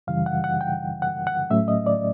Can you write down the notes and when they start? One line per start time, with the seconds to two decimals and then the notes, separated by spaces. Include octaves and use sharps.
0.07 F#2 C#3 E3 G3 F5
0.26 F#5
0.44 F#5
0.61 G5
1.02 F#5
1.27 F#5
1.50 A2 F#3 A3 C#4 E5
1.68 D#5
1.86 D5